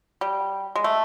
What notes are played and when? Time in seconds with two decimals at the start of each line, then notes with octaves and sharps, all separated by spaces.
0.21 G3
0.76 G#3
0.84 A3